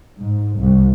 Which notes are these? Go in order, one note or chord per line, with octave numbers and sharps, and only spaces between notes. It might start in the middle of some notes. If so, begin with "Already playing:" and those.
G#2
C2